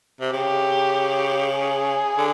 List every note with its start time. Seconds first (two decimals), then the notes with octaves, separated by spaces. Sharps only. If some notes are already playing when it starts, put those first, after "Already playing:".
0.21 C3
0.33 C#3 G4
1.55 G#4
2.17 D3